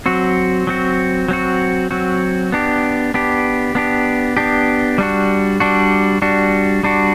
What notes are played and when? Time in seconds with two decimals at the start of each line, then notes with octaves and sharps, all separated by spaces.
0.06 F#3 C4 F#4
0.67 F#3 C4 F#4
1.28 F#3 C4 F#4
1.91 F#3 C4 F#4
2.52 B3 D4 G4
3.14 B3 D4 G4
3.75 B3 D4 G4
4.37 B3 D4 G4
4.98 G3 D4 F#4
5.60 G3 D4 F#4
6.22 G3 D4 F#4
6.83 G3 D4 F#4